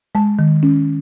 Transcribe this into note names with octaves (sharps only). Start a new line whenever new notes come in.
G#3 A5
D#3
C#4